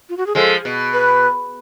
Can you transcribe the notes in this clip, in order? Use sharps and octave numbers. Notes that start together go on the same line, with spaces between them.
F4
F#4
G#4
F3 G#3 A4
B2
B4